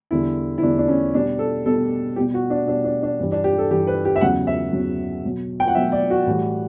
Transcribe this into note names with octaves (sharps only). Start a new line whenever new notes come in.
E2 D3 G3 E4
E4
E2 D3 G3 D4
D4
C#4
B2 G3 D4
A4
B2 G3 A4
B2 G3 G4
F#4
D4
B2 G3 D4
D4
D4
G2 E3 G3
D4
G4
A4
G2 E3 G3 G4
B4
G4
E5
E2 C#3 F#3 F#5
E5
E2 C#3 F#3
B2 F#3
G5
F#5
B2 F#3 E5
D5
F#4
A2 E3 G3